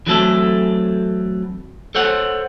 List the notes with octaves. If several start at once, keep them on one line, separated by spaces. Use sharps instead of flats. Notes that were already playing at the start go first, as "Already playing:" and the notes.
E3 F#3 A3 C4 A4
A4 C5 C#5 F#5